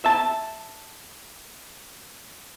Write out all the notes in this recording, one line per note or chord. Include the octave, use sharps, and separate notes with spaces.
E5 A5